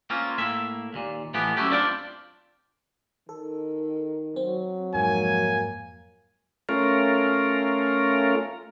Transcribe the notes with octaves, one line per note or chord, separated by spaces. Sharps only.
A#3 C4 C#4 F4
A2 A#3 E5
D#2 A#2
A2 E3 F3 B3 G4
F#2 F#3 A3 E4 G4
C4 D4 F4 D5 G5
D#3 A4
F#3 C4
F2 G#2 F3 A#3 G#5
A3 C#4 F4 A#4